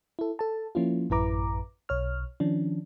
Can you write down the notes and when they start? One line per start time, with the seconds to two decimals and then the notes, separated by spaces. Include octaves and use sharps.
0.19 E4 A4
0.39 A4 A5
0.75 F3 A#3 C#4 E4 F4
1.10 A1 F#2 E4 B4 A#5 D6
1.89 B1 C#5 F6
2.40 D#3 F3 C#4 D4